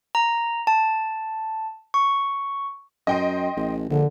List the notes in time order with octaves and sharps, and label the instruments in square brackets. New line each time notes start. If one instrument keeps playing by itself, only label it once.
[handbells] A#5
A5
C#6
[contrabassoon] F#2 [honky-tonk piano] D#5 G5 C6
[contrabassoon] A1
[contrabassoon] A#1 [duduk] D3